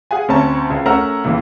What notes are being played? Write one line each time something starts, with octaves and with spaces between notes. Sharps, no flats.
G#4 F5 F#5 G#5
D2 C4 C#4 C#5 A5 A#5
C#2
A3 C#4 A#4 F#5 A#5 E6
C#2 A#2 E3